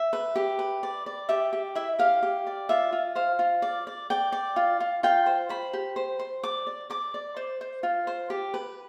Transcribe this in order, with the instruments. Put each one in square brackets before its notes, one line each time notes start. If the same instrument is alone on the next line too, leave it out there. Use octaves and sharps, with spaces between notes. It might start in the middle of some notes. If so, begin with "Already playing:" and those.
Already playing: [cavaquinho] E5
B4
G4
B4
D5
D5
G4 E5
G4
E4 E5
G4 F5
G4
D5
F4 E5
F4
C5 F5
F4
D5
D5
D5 G5
D5
F4
F4
F4 G5
C5
C5 B5
G4
C5
C5
D5 D6
D5
D5 D6
D5
C5
C5
F4
C5
G4
B4